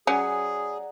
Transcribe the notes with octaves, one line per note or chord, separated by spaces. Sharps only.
F#3 C#4 G#4 D5 F#5 A#5